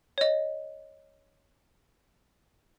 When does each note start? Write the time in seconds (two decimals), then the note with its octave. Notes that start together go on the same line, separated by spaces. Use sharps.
0.18 C#5 D#5